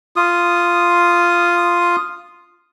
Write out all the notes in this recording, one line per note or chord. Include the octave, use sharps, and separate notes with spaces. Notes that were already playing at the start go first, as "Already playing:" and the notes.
F4 D#6